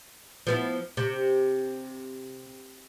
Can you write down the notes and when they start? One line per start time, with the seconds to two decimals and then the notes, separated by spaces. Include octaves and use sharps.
0.47 F3 B3 E4
0.97 C3